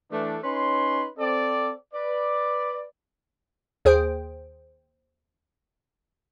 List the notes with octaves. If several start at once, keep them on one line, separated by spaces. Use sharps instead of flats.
E3 A3 D4
C#4 D#4 B4 C#5 C6
C4 A4 D5
B4 D5
D#2 G#4 C5 G5